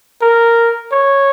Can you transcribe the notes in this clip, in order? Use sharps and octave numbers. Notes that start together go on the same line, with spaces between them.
A#4
C#5